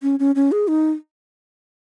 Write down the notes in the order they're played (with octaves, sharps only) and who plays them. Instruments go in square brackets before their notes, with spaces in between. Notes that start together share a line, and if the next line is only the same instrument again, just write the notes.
[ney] C#4
C#4
C#4
G#4
D#4